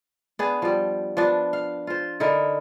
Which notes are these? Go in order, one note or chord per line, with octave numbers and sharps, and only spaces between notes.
B3 D4 G#4
F3 G3
F3 B3 D4
F5
F4 C5
D3 D#4 E4 A#4